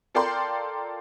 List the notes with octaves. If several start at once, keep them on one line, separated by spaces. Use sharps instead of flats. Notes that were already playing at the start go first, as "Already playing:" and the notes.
F4 A4 A#4 D5 G5 C6